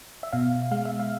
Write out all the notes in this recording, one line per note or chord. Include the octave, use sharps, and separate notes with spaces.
E5
B2 F5
G#3 F5
E5
F5